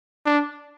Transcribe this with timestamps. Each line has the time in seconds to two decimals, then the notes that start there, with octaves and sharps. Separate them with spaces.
0.26 D4